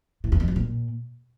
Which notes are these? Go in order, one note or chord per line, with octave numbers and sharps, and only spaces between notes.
A2
E2
F2
F#3
A#2